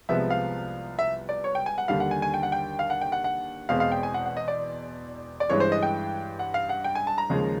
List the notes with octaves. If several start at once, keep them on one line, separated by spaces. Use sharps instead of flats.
C2 C3 F3 G#3 B3 E5
F5
E5
D5
C#5
G5
G#5
F#5
D#2 D3 G3 F5
F#5
G#5
G#5
G5
F#5
G5
F5
F#5
G5
F#5
F#5
E2 B2 G#3 C4 F5
F5
G5
G#5
F#5
F#5
D#5
D5
D5
G2 E3 G#3 C#4 C#5
C5
D#5
G5
F#5
F5
F#5
G5
G#5
A5
A#5
D#2 C#3 F3 G#3